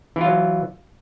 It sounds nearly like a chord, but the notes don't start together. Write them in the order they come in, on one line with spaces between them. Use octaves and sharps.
E3 F4 F#3